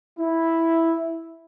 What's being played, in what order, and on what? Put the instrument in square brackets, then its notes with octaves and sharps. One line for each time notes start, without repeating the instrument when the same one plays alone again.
[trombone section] E4